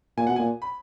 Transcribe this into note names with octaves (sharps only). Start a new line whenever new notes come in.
A#2 G#5
B2 F#5
G#5
A#2
B5